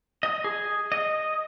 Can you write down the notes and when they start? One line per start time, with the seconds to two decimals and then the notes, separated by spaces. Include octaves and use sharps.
0.23 D#5
0.44 G#4
0.92 D#5